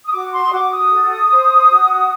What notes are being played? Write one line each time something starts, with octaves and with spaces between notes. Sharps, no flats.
D#6
F#4 D6
C6
D#6
F#4 D6
D#6
A4
C5
F#4